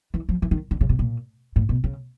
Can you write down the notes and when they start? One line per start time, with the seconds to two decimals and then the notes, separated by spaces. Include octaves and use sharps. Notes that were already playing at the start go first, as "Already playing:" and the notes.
0.14 E3
0.29 F3
0.42 E3
0.51 D#3
0.71 D3
0.81 C#3
0.89 C3
0.99 A#2
1.56 A2
1.69 B2
1.84 C#3